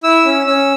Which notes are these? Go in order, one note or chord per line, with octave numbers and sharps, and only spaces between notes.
E4 E6
C#4
C#4 E6